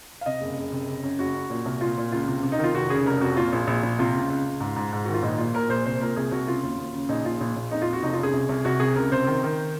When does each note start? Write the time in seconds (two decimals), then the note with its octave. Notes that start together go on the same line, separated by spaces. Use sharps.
0.21 F5
0.26 C3 D#5
0.41 F#1
0.57 F#1
0.72 C3
0.87 C#3
1.03 F#2
1.19 F#1 F#4
1.34 F#2
1.50 A#2
1.65 C2
1.81 A#2 F4
1.97 A#2
2.12 C#2 F4
2.28 C3
2.43 C3
2.52 D#4
2.59 D#3 F4
2.74 F1 F#4
2.90 C#3 G#4
3.06 F1 A#4
3.21 F2 F#4
3.37 A#2 F4
3.52 A#1
3.67 A#1
3.83 A#1
3.99 C3 F4
4.15 C#2
4.30 C#2
4.46 C#2
4.60 G#2
4.76 G#2
4.93 G#2
5.04 D#3 F#4
5.14 F4
5.22 A#1 D#4
5.38 A#2 F4
5.54 A#2 A#4
5.69 A#1 C5
5.86 C2 C5
6.01 A#2 A#4
6.16 C2 G#4
6.31 C2 F#4
6.47 C#3 F4
6.63 D#2
6.78 D#2
6.93 C#3
7.09 A#1 D#4
7.25 A#1 F4
7.41 A#1
7.56 A#1
7.71 F2 D#4
7.82 F4
7.87 F2
7.93 F#4
8.03 F1 D#4
8.13 F4
8.19 C#3 G#4
8.33 C2
8.49 C2
8.65 C2 F#4
8.80 C3 G#4
8.95 C#2 A#4
9.12 C3 C5
9.27 D#3
9.43 D#3